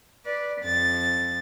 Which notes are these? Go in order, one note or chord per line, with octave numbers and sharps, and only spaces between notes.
B4 D5
F2 A6